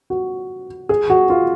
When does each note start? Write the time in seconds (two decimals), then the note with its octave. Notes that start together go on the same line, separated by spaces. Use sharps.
0.10 F#4
0.89 G#4
1.10 F#4
1.30 F4